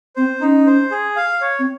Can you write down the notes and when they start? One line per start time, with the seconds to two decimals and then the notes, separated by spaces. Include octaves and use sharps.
0.16 C4 C5
0.41 C#4 D#4
0.66 C5
0.91 G#4
1.16 F5
1.41 C#5
1.59 C4